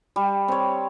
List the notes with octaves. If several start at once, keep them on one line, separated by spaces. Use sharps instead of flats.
G3
C4 C#5